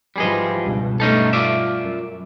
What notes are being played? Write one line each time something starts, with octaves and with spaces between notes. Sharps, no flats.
G#2 E3 F3 G3 G#4 D#5
C#2 G2 B2
G2 B2 A3 C#4 D#4 A4
F4 D5 E5
F#2